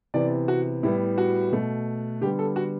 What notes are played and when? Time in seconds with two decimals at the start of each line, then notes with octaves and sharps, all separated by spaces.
0.14 C3 E3 B3 D5
0.48 F#4
0.83 A2 G3 B3 E4
1.18 F#4
1.52 B2 A3
2.21 D3 G3 B3 G4
2.39 A4
2.56 F#4